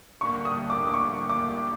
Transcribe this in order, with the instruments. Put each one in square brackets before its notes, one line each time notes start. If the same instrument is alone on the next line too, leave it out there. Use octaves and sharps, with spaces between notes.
[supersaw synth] D3 G3 A#3 D4 G4 [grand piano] C#6
[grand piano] D#6
D6
D6
C#6
D6